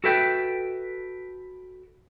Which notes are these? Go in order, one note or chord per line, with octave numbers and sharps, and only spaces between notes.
F#4 A4 B4 E5 G5